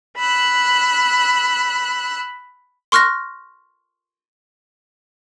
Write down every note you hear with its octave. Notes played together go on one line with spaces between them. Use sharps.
B5 E6 F#6
C6 C#6 F6 F#6 A#6